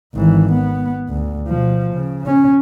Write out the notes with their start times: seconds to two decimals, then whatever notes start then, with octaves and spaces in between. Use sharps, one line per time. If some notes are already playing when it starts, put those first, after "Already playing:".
0.15 G#1 E3
0.52 B3
1.09 D2
1.48 B2 F3
1.93 C#3
2.26 C#4